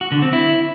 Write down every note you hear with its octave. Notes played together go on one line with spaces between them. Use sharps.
F#4
D3
C4
E4